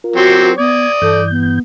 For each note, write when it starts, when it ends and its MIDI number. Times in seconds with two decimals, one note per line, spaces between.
0.04 0.54 65
0.04 0.54 70
0.16 0.51 54
0.16 0.51 60
0.16 0.50 66
0.16 0.51 67
0.58 0.86 59
0.58 1.26 74
0.58 1.26 87
0.58 0.92 92
1.02 1.59 43
1.02 1.59 52
1.02 1.20 69
1.02 1.59 91
1.31 1.59 59